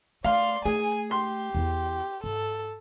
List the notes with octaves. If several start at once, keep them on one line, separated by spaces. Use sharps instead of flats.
A3 D5 F5 C6
A3 G#4 G#5
G4 C6
E2 E4
G#2 A4